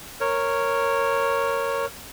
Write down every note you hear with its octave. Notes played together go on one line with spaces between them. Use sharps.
A#4 C#5